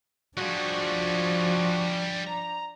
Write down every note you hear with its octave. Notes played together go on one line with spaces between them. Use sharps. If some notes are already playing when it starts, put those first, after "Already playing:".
F3 G3 D4 F#4 G#4
A#5